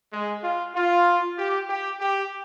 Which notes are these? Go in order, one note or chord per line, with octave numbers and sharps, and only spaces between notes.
G#3
F4
F4
G4
G4
G4